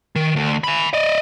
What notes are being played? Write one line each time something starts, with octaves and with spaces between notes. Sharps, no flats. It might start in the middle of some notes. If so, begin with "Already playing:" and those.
D#3
D2
G#5 B5
D5 D#5